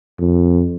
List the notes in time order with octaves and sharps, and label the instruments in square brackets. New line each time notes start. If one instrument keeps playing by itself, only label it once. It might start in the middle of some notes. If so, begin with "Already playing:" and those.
[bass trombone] F2